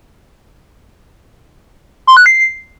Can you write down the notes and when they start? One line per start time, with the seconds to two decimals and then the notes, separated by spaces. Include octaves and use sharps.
2.07 C6
2.17 F#6
2.26 C7